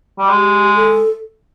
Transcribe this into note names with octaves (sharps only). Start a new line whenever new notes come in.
G3
G#3 G4
A4